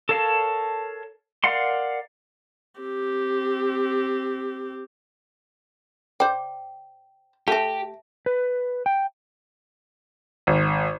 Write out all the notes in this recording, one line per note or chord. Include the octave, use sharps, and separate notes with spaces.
A4 A#4 C#5 F5 A5
A#4 D5 F5 F#5 C6
C4 G4
C5 D5 G5
A3 G4 A4 E5 A5
B4
G5
G#1